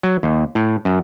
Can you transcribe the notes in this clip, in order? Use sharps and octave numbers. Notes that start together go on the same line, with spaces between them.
F#3
D#2
A2
F#2